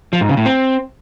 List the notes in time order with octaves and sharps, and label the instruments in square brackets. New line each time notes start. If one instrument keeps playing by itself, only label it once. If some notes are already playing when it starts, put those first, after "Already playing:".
[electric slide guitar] F3
G#2
C#3
A2
C4